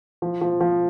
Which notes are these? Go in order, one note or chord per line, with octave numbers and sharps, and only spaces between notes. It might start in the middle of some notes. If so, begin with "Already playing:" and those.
F3
F3
F3